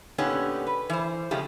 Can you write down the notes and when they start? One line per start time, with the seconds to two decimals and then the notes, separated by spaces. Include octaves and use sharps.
0.18 A#2 D3 B3 C#4 D#4 G4
0.67 B4
0.90 E3 C5
1.31 C#3 F3 G#3 A3 G4